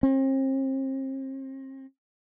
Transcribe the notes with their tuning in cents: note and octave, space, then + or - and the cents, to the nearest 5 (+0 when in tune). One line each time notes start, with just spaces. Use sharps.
C4 +40